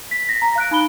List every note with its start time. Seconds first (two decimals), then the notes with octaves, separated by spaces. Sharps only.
0.11 B6
0.29 A#6
0.42 A#5
0.56 F5 F#6 D7
0.71 D#4 B5 G7